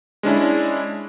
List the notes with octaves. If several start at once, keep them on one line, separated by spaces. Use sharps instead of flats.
G#3 C#4 D4 E4